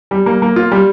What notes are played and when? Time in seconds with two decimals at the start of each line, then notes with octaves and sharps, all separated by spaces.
0.11 G3
0.26 A#3
0.42 A#3
0.56 F4
0.72 G3